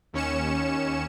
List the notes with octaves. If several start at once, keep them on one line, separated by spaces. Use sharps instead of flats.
D#2 C#4 C#7 E7